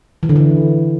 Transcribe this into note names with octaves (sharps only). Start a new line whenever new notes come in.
E3
D3
E3